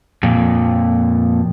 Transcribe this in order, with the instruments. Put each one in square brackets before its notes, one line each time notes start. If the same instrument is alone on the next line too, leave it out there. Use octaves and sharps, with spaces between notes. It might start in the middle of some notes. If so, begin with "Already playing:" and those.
[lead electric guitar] F2 A#2